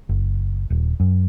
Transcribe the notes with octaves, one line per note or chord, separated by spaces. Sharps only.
F#1
D#1
F#2